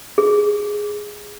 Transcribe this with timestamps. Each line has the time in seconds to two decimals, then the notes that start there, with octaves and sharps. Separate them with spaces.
0.18 G#4